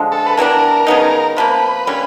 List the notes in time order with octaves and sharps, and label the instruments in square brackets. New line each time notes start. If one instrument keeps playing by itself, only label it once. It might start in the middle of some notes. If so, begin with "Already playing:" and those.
Already playing: [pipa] D3 F3 G#3
[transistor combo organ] A4
B4
[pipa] E3 G3 B3 D4 [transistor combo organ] A#4
[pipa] C#3 F#3 B3 D#4
[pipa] C3 F3 A#3 [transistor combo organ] B4
[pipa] D3 G3 A#3 C#4